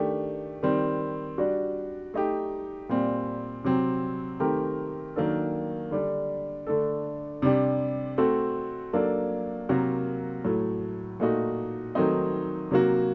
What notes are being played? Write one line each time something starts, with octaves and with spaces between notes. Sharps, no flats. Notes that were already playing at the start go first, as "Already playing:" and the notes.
Already playing: D#3 A3 D4 G4
D#3 G3 C4
G3 D4 F#4
A3 D#4 G4
A#2 G3 C4
C3 F#3 C4
D#3 A3 C4 G4 A#4
D#3 F#3 A#3 D4 A4
D3 G3 D4
D3 A3 D4 A4
C3 G3 D4 G4
A3 C4 F#4 A4
F#3 A#3 D4 A4
C3 F#3 A#3 F#4 A#4
A2 F#3 A3
A#2 A3 D#4 F#4
D#3 F#3 A3 C4 D#4
C3 F#3 A#3 F#4